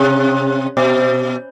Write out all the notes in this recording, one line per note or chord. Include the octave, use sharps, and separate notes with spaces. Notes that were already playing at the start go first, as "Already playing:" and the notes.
Already playing: C3
B2